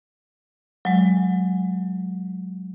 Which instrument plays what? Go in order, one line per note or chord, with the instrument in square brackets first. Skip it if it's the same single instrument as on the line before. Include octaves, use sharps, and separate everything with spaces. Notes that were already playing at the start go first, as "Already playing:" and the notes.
[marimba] F#3 G#3